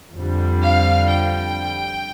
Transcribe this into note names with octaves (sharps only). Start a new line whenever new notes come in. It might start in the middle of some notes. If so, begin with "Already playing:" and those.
F2 D3 G3
F5
G5